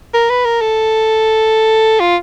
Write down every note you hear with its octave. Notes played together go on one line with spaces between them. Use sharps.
A#4
B4
A#4
A4
F4